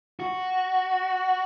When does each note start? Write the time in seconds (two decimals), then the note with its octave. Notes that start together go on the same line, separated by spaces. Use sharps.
0.20 F#4